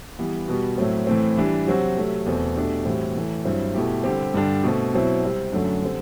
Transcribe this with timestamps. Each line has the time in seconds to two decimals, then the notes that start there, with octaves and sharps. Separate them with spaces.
0.19 E3 G3 B3
0.48 B2 G3 B3 F#4
0.78 A2 F#3 A3 C4
1.07 A2 E3 A3 C4
1.37 E3 G3 D4
1.67 C3 F#3 C4 F#4
1.97 C3 F#3 A3
2.26 E2 B2 A3 C4
2.56 B2 A3 D4 G4
2.85 A2 E3 G3 C4 F#4
3.15 A2 E3 A3
3.45 G2 F#3 C4 E4
3.74 B2 A3 E4 G4
4.04 D3 G3 C4 G4
4.34 G2 D3 G3 D4 G4
4.63 B2 A3 C4
4.93 B2 F#3 C4 E4
5.23 C3 G3 C4
5.52 F#2 D3 F#3 A3 D4
5.82 D3 G3 C4